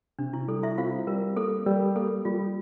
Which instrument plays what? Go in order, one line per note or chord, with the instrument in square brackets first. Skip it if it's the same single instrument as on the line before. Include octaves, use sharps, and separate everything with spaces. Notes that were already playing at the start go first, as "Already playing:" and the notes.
[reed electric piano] C3 [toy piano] D4
[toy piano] E4
[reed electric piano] G3 [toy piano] A4
[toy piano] E4 E5
[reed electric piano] C4 [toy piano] F4 F5
[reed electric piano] G3 [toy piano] A#4
[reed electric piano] A#3 [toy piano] A4
[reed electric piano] G3 [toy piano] A#4
[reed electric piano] A#3 [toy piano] A4
[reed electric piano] G3 [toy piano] F4